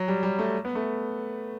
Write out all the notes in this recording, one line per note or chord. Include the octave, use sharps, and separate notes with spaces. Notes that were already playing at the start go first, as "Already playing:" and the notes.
Already playing: F#3
G3
G3
A3
B3
A3